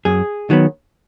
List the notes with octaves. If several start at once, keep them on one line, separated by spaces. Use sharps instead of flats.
F#2 G#4
D#3 F#3 B3